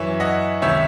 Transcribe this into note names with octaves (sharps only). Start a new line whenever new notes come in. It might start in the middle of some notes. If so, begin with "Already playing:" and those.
Already playing: F#2 E3 C#5 E5
D#5 F#5
C#2 C3 D#3 C#5 E5